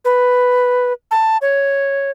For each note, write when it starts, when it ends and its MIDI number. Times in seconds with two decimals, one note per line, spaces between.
0.05 0.93 71
1.11 1.38 81
1.42 2.11 73